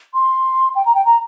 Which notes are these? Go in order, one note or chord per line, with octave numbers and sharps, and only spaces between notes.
C6
G5
A#5
G5
A#5